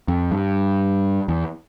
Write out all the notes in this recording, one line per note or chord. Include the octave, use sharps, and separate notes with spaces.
F2
G2
E2